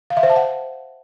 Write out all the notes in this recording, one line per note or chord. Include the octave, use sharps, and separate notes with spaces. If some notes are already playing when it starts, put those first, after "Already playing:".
F5
E5
C5
A5
F#5